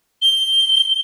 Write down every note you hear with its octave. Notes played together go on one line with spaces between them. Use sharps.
G7